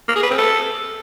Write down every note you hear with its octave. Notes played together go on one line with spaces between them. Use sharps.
A#3
G#4
B4
C4
A4